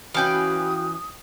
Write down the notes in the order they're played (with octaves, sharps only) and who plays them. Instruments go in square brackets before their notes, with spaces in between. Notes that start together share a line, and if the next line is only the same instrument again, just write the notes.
[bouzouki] E3 C#4 B4 [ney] F#4 [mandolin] F5 G5 [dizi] D#6